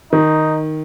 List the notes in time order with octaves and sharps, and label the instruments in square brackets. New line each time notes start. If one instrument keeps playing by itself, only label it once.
[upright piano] D#3 [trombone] D#4